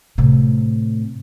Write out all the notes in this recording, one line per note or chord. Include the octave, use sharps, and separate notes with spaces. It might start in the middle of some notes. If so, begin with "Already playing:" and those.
A2 C3